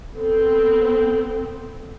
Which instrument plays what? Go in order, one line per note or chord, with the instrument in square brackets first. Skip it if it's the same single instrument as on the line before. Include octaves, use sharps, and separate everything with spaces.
[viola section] B3 C4 [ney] A4